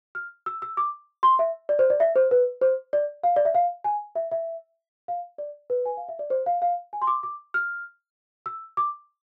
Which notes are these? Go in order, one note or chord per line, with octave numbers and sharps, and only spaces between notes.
F6
E6
E6
D6
C6
E5
D5
C5
D5
E5
C5
B4
C5
D5
F5
D5
E5
F5
G#5
E5
E5
F5
D5
B4
G#5
F5
E5
D5
C5
F5
F5
G#5
C6
D6
D6
F6
E6
D6